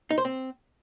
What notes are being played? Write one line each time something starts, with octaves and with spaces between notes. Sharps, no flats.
D#4
C5
C4